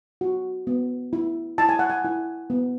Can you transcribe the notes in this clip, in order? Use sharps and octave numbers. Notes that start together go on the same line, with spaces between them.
F#4
B3
E4
E4 A5
G#5
F#5
G#5
E4
B3